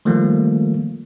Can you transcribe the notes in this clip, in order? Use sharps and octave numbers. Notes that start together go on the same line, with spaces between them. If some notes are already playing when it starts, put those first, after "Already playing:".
D#3 F3 G3 A3 A#3